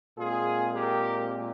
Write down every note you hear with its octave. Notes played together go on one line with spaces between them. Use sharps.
A#2 G#3 C4 F4 G#4
G4 A#4